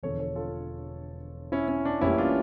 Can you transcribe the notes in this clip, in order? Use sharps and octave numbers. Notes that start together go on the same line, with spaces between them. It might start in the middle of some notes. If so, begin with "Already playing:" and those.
E1 E2 D3 F3 A4 C#5
A4 C#5
F4 A4
C#4 E4
C#4
D4
A1 A2 E3 G3 A#3 C#4 E4
D4 F4